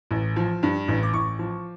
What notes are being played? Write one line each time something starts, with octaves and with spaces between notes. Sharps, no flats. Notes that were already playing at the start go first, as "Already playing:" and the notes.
A1
F3
G2
A1
D6
A1 C#6
F3